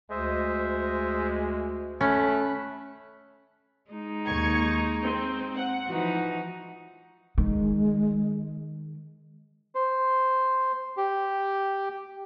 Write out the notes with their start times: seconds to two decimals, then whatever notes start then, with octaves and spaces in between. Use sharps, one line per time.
0.10 D2 G#3 C5 D#5 E5
2.01 A3 C#4 B5 F#6
3.91 G#3 D#4
4.27 D#2 C#6 G#6
5.04 C4
5.56 F#5
5.89 E3 F3 D#4 F#4
7.38 D#3 G#3
9.75 C5
10.97 G4